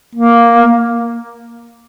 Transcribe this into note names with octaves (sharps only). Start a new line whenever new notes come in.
A#3